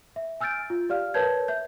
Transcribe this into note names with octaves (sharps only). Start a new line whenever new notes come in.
E5
G#5 E6 F6 G6 A6 D7
F4
G4 D5 F5 F6
A#4 B4 C#5 A5 G6 G#6
E5 G6